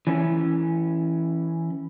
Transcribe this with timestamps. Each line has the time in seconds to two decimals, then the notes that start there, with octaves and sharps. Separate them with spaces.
0.07 E3 C#4